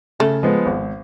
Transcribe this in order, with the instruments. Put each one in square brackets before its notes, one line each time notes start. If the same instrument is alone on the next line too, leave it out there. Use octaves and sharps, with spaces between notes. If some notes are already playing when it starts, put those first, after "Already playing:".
[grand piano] C#3 [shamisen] A3
[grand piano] F3 G#3 B3
G#1